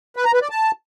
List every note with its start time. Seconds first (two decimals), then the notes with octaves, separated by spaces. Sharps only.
0.16 B4
0.25 A#5
0.33 B4
0.42 D5
0.50 A5